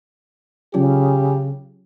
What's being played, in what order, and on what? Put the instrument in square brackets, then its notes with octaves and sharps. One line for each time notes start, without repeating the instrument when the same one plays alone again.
[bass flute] C#3 [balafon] F#3 C#4 F4 [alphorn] G4